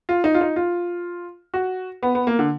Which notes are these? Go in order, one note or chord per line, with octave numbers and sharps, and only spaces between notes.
F4
D#4
F4
D#4
F4
F#4
B3
B3
A#3
D3